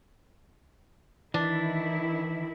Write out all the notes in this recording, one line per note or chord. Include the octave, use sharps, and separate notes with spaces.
D#3 E3 D4 E4